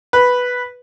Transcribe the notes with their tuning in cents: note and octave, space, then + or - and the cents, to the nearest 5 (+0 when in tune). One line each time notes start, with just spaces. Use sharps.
B4 +0